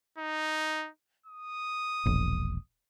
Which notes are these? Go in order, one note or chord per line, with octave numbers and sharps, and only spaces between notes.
D#4
D#6
E1 A#1